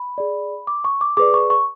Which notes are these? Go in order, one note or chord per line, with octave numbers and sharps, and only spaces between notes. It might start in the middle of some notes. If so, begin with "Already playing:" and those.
Already playing: B5
G#4 D5
D6
C#6
D6
G#4 B4 D5 D6
C#6
C#6